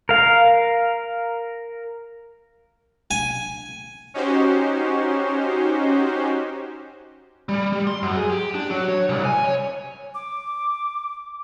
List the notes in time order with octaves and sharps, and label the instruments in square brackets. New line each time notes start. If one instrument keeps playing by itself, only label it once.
[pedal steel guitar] A#4 F5
[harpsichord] G#5
[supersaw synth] C#4 D#4 F#4 G4 C5
[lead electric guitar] G3
G3
C6
F#2
G#4
G4
D4
F#3
C#5
C2
G#5
C#5
[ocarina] D6